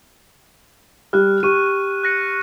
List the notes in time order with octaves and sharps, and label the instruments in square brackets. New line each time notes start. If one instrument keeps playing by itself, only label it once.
[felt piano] G3 [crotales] F6 F#6
[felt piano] G4 [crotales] C#6 D#7
[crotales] F#6 A#6 C#7